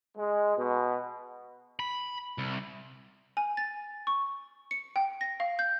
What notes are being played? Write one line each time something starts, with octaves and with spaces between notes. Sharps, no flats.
G#3
B2
B5
C2
G#5
A6
C#6
C#7
G5
A#6
F5
G6